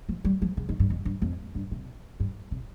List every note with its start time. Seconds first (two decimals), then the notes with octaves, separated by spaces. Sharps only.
0.09 F3
0.25 G3
0.42 F3
0.57 C#3
0.69 D#3
0.79 G2
0.90 F2
1.05 G2
1.22 F2
1.55 G2
1.71 C3
2.20 G2
2.51 C3